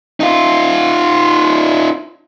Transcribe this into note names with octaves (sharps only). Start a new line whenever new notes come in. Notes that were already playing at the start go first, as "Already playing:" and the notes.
D#4 F4